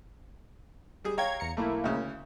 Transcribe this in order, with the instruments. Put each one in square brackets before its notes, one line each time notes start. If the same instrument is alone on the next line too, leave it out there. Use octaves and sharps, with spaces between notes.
[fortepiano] G3 G#4
[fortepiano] C#5 F5 G5 [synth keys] A#5 C#6 G#6
[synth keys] E2 A#5 C#7
[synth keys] B1 A#3 E4 [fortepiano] A3
[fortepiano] D2 C#3